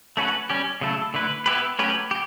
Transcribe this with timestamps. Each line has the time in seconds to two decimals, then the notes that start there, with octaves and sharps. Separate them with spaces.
0.17 A3 C#4 F#4 B4
0.50 G3 C#4 G4
0.81 C#3 F#3 A3 E4 A4
1.14 D3 A3 E4 B4
1.46 B3 E4 G4 B4
1.79 F#3 A3 C#4 G4 B4
2.11 G4